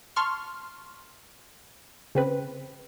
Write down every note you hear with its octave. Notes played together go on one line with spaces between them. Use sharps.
A5 C6 C#6 F6
C#3 C4 B4